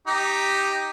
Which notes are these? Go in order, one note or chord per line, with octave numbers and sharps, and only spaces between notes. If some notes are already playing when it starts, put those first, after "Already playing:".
D#4 G4